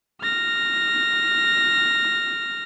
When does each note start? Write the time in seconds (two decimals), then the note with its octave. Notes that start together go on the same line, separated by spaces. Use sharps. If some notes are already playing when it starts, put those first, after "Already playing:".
0.21 F6 A#6